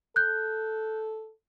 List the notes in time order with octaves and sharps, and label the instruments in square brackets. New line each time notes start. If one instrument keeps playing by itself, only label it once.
[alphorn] A4 [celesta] F#6 G6